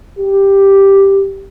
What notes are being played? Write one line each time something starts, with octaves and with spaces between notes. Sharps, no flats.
G4